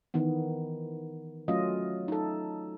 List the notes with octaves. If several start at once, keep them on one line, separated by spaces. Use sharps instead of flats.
D#3 E3 B3
F#3 A3 C#4 F4 D#5
D#4 A4